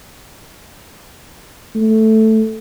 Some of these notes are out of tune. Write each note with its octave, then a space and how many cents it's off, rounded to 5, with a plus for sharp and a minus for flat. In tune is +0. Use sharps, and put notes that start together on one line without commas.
A3 +0